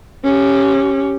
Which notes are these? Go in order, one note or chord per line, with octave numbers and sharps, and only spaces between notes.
C#4 G4